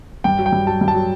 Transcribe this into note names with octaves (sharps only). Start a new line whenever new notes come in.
G2 G5
F#3
G5
G2
F#3 A5
G2
A5
F#3